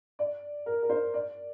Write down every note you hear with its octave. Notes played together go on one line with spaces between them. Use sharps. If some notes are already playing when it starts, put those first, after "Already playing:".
D5
A#4
A#4
C5
D5